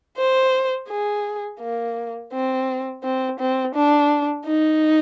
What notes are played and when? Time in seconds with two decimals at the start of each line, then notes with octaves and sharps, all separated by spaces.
0.18 C5
0.89 G#4
1.60 A#3
2.32 C4
3.04 C4
3.39 C4
3.75 D4
4.46 D#4